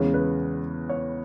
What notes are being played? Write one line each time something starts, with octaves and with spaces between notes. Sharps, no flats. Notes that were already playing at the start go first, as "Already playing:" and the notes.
Already playing: E2 C#3 G#3 C#4
B4
C#5